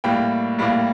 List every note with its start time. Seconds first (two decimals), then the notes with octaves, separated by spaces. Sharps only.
0.04 A2 G3 A#3 G5
0.59 A2 G3 A#3